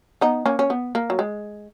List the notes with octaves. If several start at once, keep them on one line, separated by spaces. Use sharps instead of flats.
B3 D#4
A#3 C#4
C#4
B3
A#3
F#3
G#3